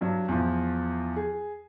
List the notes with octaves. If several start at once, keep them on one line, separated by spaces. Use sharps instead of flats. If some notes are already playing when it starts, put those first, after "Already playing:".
G2 F#3
E2 F3
G#4